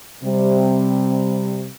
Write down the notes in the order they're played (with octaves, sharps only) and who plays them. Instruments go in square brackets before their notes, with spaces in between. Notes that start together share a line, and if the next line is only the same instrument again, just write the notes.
[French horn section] C3 G3